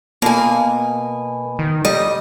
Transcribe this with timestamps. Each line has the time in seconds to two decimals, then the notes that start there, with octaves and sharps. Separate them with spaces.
0.22 B2 A#3 G#5
1.59 D#3
1.85 G3 D#5